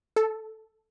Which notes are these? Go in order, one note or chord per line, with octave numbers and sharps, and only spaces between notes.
A4